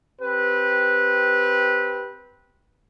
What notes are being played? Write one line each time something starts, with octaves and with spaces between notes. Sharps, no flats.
C4 G4 B4